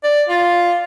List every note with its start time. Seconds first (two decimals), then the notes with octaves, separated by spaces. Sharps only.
0.04 D5
0.29 F4